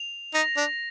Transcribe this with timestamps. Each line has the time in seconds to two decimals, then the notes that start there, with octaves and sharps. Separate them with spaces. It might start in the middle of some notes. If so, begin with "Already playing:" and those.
Already playing: F7
0.34 D#4 A#6
0.57 D4